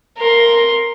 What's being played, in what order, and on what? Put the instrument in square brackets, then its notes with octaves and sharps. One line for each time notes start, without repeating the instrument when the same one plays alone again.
[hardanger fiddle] A#4 C6